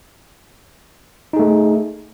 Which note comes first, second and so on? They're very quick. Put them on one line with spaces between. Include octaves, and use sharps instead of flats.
D#4 G#4 A3